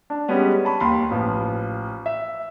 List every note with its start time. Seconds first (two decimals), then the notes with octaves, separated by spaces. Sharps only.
0.10 D4
0.28 G3 G#3 B3 C#4
0.65 A5 B5 C#6
0.80 D#2 B5 C6
1.11 A1 F3
2.06 E5